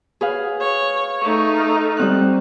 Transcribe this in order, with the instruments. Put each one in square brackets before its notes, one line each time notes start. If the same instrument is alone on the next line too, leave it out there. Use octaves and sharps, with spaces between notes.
[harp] G#4 B4 F5
[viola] C#5
[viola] A3 D#4 [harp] C#6
[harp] F6
G3 C4 F#6